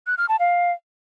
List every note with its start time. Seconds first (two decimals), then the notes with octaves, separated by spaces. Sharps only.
0.07 F#6
0.18 F6
0.29 A5
0.40 F5